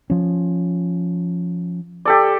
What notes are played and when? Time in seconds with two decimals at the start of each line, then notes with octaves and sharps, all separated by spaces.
0.10 F3 C#4
2.05 G4 A4 D5